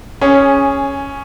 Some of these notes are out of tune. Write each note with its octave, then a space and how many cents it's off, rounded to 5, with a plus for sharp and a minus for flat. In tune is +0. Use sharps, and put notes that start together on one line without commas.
C#4 +0 G#4 -10